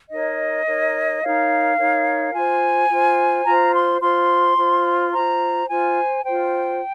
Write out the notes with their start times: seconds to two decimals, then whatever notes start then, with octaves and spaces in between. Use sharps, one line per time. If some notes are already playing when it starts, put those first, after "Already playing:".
0.10 D#4 A#4 C#5 D#5
0.66 D#4 A#4 C#5
1.22 D#4 A#4 C#5 F5
1.78 D#4 A#4 C#5
2.33 F4 C5 G#5
2.89 F4 C5
3.45 F4 C5 A#5
3.74 C6
4.01 F4 C5 C6
4.57 F4 C5
5.13 F4 C5 A#5
5.68 F4 C5 G#5
6.24 F4 C5 G5